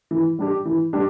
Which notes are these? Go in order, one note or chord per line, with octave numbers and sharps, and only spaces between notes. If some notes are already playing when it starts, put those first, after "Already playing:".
E3
G3 D4 G4
E3
G3 D4 G4